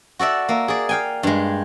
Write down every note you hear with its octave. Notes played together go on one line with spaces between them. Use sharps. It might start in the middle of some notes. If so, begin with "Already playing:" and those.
F#4 A4 D5 E5
A#3 E5
G#4 D5
F5 G5 G#5
G2 G#3